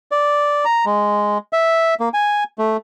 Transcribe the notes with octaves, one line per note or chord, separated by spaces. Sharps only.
D5
A#5
G#3
E5
A#3
G#5
A3